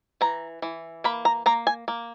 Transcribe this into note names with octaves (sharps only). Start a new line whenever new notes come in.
E3 A#5
E3
A#3 B5
A#5
A#3 A#5
G#5
A#3